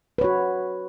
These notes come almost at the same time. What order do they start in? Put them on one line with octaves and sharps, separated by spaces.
B4 C#5 F#4